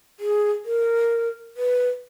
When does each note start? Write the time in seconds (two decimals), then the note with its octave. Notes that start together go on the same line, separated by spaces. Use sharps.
0.20 G#4
0.65 A#4
1.57 B4